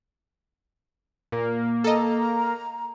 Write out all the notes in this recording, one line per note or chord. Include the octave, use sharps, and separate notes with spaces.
A#2 A#3
A4 D#5 A#5